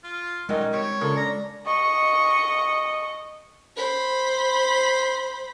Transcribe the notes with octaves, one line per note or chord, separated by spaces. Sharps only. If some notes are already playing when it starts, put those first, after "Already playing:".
F4
A#2 D#3 F#3 G#3 C#4 D#5
G3 C4 C#5
A#2 C#3 A4
D4 A#5
D#5 C#6
C5 B5